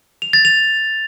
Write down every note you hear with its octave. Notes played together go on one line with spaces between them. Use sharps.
F7
A6
F7